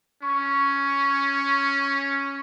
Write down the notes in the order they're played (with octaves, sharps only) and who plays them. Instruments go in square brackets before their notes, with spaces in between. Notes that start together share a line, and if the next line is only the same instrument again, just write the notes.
[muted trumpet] C#4 [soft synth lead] C#6